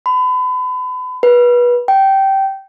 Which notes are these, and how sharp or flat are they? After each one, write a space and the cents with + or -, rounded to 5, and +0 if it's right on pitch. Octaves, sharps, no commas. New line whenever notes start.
B5 +35
B4 -25
G5 -15